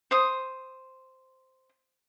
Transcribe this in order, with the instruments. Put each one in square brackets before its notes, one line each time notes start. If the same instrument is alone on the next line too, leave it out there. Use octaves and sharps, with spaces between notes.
[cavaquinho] C5 D#6